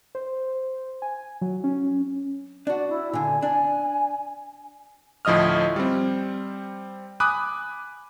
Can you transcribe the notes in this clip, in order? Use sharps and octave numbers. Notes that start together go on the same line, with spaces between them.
C5
G#5
F#3
C#4
D4 F#4 D5
E4
A#2 D3 G#5
D4 G#5
D2 A2 F3 D#5 D#6 F6
G3 C4
G#5 B5 D6 D#6 F#6